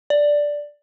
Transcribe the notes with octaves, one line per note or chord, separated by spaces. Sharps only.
D5